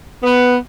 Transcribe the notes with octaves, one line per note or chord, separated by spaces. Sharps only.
B3